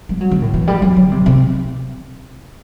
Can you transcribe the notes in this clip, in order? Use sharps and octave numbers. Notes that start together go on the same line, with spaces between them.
G3
F#3
D3
A2
E3
G3
F#3
D3
C3
C3